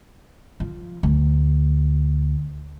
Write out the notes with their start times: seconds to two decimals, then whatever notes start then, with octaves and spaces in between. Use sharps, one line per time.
0.60 F3
1.03 D2